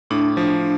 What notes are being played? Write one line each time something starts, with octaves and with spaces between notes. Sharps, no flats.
A2 D4
F3